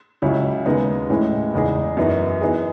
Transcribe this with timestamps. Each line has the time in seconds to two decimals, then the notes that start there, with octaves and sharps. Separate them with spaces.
0.22 C#2 C#3 F#3 C#4 E4
0.66 D#2 C#3 G#3 B3 D#4
1.10 A2 E3 G#3 C#4 E4
1.54 E2 C#3 G#3 D#4 G#4
1.97 F#2 E3 B3 D#4 F#4
2.41 E3 B3 D#4 G#4